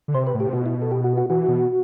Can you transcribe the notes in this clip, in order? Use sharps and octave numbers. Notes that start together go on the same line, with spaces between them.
D3
C3 C5
B4
A2
G4
C3
B2 F#4
E4
A4
G4
F#4
F#4
E3 F#4
B2